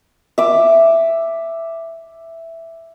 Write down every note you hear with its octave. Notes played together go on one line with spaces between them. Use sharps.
E5 D6